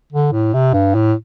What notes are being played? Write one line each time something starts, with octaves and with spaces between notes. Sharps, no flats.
D3
A2
C3
G2
A2